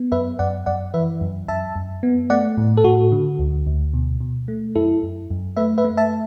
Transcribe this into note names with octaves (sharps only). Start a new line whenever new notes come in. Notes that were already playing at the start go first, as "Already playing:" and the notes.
Already playing: B3
F#2 B4 E5
F#2 D5 F#5
F#2 D5 F#5
E3 B4 E5
F#2
F#2 E5 A5
F#2
B3
A3 D5 F#5
A2
A4
A2 F#4
D3
D2
D2
B2
B2
A3
F#2 E4 A4
F#2
F#2
A3 B4 E5
B4 E5
A3
E5 A5